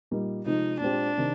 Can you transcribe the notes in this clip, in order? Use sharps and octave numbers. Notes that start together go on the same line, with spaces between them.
A#2 G3 A#3 D#4
C3 F3 G#3 D#4
A#2 G#3 C4 D4 G4
C3 D#3